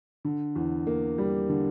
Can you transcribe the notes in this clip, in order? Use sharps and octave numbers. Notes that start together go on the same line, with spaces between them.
D3
E2
A#3
G3
D3